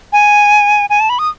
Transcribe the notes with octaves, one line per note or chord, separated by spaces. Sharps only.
G#5
G#5
A5
B5
D#6